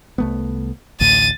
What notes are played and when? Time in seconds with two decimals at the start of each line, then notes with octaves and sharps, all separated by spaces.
0.18 C2 A3 B3
1.01 A1 D2 A2 A6 D#7